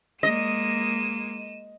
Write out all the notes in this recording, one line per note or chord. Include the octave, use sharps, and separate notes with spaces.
G#3 A#3 D#5 D#7 E7